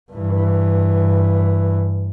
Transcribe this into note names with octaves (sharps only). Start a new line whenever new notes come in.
G2 E3